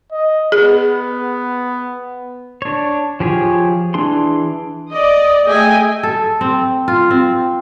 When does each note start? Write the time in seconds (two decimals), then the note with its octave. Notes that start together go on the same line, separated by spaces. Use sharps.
0.12 D#5
0.52 B3 G#4
2.62 D4 C#5
3.20 F3 G4 G#4 C#5
3.94 E3 D4 G#4 C6
4.89 D5 D#5
5.46 A3 G#4 D#5 E5 G5 G#5
6.03 A4
6.41 C4
6.88 F4
7.10 C4